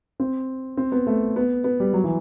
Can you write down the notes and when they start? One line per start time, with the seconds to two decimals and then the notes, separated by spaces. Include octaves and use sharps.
0.20 C4
0.77 C4
0.92 B3
1.07 A3
1.36 B3
1.64 B3
1.80 G3
1.93 F#3
2.04 E3